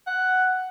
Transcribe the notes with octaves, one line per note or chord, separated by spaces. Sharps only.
F#5